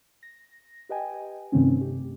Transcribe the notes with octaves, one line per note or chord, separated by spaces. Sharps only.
A#6
G4 B4 D#5 G5 G#5
G2 C3 D#3 A3 C4 C#4
G4